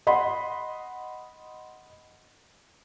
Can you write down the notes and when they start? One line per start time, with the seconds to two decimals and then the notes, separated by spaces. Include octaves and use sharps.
0.07 D#5 F#5 B5 C6